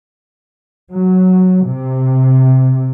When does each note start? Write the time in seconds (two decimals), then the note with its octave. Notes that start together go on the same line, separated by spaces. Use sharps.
0.92 F#3
1.66 C3